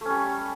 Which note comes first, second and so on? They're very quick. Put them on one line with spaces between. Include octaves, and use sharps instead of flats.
A3 C#4 G3